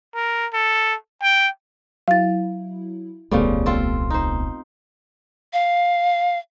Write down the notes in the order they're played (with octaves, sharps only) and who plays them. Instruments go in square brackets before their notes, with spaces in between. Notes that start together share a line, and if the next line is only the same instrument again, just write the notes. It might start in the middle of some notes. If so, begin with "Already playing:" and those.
[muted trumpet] A#4
A4
G5
[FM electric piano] F#3 E4 [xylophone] F5 A6
[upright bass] D#1 C2 [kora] C#3 F3 G3 [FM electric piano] A3 B3
[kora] C4 F4 A4
D#4 C5
[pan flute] F5